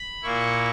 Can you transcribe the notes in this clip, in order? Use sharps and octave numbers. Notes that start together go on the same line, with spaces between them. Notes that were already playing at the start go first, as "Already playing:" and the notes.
Already playing: B5
A#2 A#3 E4 C#6